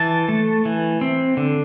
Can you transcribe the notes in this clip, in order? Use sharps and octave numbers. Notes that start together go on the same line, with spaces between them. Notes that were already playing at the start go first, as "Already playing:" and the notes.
Already playing: E3 A5
A3
E3
C4
D3